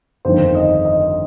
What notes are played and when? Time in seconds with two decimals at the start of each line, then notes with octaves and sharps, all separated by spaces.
0.25 G1 F2 D#3 C5
0.55 D#5
0.85 D#5